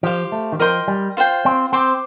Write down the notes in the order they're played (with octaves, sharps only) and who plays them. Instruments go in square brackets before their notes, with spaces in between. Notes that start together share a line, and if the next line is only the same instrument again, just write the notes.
[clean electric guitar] F3 [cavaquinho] G4 C5 F5
[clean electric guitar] A3
D#3
[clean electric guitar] F3 [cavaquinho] A#4 D#5 G5 C6
[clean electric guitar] G3
[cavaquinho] F4 C5 G5
[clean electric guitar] C4
[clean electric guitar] C4 [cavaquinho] C5 G5 D6